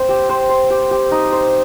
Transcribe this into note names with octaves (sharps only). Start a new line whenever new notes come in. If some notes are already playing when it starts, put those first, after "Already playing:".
Already playing: C4 C5
G4
C5
C5
G4
G4
D#4
C5